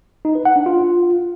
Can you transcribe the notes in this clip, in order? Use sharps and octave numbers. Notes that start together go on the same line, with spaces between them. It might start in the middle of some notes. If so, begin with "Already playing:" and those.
D#4
B4
F#5
D4
F4